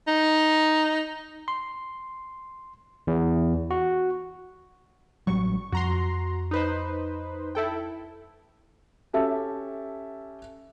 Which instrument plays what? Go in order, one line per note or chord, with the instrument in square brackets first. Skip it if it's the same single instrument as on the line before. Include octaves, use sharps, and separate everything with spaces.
[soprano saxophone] D#4
[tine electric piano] C6
E2
F#4
[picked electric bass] A1 F#3 G3 [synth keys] C#6
[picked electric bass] F2 [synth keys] F#4 A#5 C6
[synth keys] D#4 B4 C5
E4 A4 G5
[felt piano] C#4 G4 A4 E5 A5